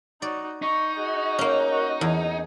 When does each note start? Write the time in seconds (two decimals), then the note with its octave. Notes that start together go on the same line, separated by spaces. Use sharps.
0.22 D#4 F#4 D5
0.62 D#4 C#6
0.96 F#4 G#4
1.38 A#3 C#4
1.71 F#4 A#4
2.01 E2 G#4 G#5